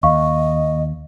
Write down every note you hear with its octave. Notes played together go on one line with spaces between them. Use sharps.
D#2 D#5 F5 C#6